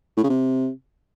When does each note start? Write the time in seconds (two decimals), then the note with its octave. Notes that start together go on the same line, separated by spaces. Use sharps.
0.17 A2
0.24 C#3
0.30 C3